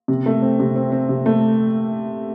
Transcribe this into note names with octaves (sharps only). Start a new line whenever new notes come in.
C3
A3
C4
C3
C4
C4
C3
A3